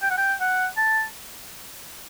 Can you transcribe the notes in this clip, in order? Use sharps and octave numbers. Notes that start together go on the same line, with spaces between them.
G5
F#5
G5
F#5
A5